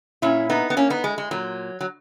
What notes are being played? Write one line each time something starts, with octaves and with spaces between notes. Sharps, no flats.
A#2 C#4 E4
B3 D#4
B3
A#3 C#4
B3 D#4
G#3
G#3
A#2 F#3
F#3